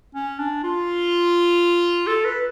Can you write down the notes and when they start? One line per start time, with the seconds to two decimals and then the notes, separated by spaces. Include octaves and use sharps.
0.15 C#4
0.39 D4
0.63 F4
2.07 A4
2.25 B4